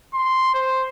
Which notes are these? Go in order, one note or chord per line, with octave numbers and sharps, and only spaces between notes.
C6
C5